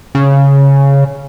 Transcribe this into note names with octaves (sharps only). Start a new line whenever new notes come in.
C#3